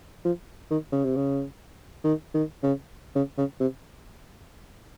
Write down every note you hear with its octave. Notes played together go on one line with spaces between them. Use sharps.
F3
D#3
C#3
C3
C#3
D#3
D#3
C#3
C#3
C#3
C3